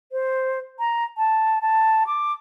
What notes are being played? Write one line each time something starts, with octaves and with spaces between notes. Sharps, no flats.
C5
A#5
A5
A5
D6